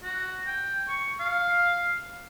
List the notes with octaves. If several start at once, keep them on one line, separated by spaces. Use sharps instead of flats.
F#4
G5
C#6
F5